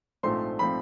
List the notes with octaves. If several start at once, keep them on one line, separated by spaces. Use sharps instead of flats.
A#1 G#2 F3 A3 C4 C6
F3 A3 C4 B5